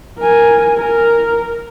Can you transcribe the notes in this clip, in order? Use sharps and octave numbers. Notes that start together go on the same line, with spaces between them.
A#4 G#5
A#4